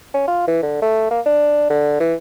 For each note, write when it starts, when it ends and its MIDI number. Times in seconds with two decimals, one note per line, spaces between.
0.14 0.24 61
0.28 0.46 65
0.48 0.59 52
0.63 0.80 50
0.82 1.07 57
1.11 1.20 58
1.26 1.69 62
1.70 1.97 50
2.00 2.14 52